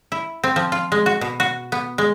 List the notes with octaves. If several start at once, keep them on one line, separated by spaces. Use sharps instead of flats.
E4
C4
F3
F4
G#3
F#4
B2
F#4
B3
G#3